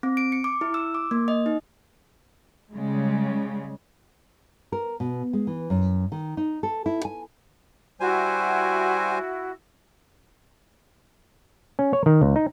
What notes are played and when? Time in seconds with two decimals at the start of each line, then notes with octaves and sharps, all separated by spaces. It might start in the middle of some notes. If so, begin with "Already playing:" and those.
0.03 C4
0.17 D7
0.32 C#7
0.44 D6
0.61 E4
0.74 E6
0.95 D6
1.11 A#3
1.28 D#5
1.46 D#4
2.73 C#3 G3 G#3
4.72 A#4
5.00 B2
5.33 G#3
5.47 E3
5.70 F#2
6.12 D#3
6.37 D#4
6.63 A4
6.86 E4
7.05 G#5
8.00 G3 E4 F#4 C5 G#5
11.79 C#4
11.93 C#5
12.06 D#3
12.22 C#2
12.36 D#4